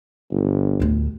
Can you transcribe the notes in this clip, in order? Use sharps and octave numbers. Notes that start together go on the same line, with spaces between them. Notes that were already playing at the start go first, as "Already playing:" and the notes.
G1
D2 A2